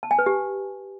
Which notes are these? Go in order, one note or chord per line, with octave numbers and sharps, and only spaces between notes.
A5
G#5
B4
G4